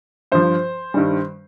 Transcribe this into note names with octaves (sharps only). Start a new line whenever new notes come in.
G2 F3 C5
G2 D#3 G3